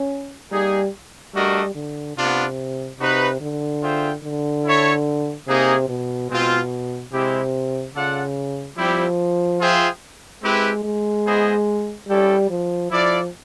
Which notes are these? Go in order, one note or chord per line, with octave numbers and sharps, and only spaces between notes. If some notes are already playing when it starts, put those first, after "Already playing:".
Already playing: C#4
G3 A#3 D#4 G#4
G3 A3 D4 F#4 A#4 D#5
D3
C3 B3 D4 F4
C3 D#4 F#4 B4
D3
F4 G#4 C5 E5 G5
D3
E4 A4 C#5 E5
C3 A#3 D#4 G#4
B2
B2 G#3 C4 F4
C3 G#3 C4 E4 G4
C#3 F4 A4 D5 F#5
F3 G3 C4 E4 G4
F4 G#4 C5 E5 G5
G#3 C4 E4 G4 B4
G#3
B3 E4 G#4 C5 D#5
G3 C#4 E4 A4 D5 G5
F3
F3 E4 A4 D5 F5